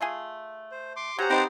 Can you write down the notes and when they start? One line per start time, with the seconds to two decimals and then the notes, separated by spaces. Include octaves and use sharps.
0.01 A3 F4 G#4
0.72 C5
0.96 C6 D6
1.19 F#3 C#4 G4 C5 F#5 A#5
1.30 C4 D#4 B4 D#5